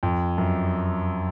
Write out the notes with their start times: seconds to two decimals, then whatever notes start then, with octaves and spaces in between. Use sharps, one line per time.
0.03 F2
0.38 F#2